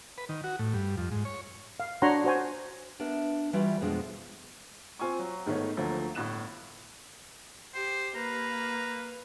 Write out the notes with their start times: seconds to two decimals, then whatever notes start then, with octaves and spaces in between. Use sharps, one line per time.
0.18 B4
0.29 D#3
0.44 F#4
0.59 A2
0.74 G2
0.98 F2
1.12 G#2
1.25 C#5
1.80 F5
2.02 D4 F#4 C#5 F#5 A#5 C6
2.24 F#4 C5 G#5
2.99 B3 D4 A#4 E5
3.53 E3 G3 F4 F#4 D5 E5
3.81 F2 B2 G#3 D4 F4
4.99 C4 F4 G#5 C#6
5.19 F#3
5.46 G#2 D#3 A3 B3 C#5
5.77 D2 F3 F#3 A3 A#3
6.15 G1 A2 F#6 E7
7.74 G4 C5
8.15 A#3 B4 A#5